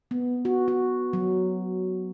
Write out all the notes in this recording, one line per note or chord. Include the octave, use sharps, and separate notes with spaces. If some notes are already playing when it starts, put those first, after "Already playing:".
B3
F#4
F#4
F#3